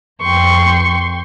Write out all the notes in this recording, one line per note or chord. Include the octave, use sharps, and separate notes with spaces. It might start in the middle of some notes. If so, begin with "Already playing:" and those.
F2 G5 C6 C#6